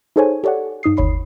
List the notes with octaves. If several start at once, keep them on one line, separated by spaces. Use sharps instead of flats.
D#4 G#4 A4 C5 C#5 G#5
G4 A4 C#5 D5 F#5
G2 D#4 D#6 C7
G1 D#2 C#5 B5 C7